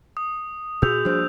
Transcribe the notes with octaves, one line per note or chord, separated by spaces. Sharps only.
D#6
A#2 F#4 G#4 E6 G6 F7
F3 G3 A#3 D4 C5 D#6 G6